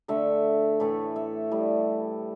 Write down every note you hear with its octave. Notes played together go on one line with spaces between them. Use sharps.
D3 A3 E5
A2 E3 A3
E5
A2 G3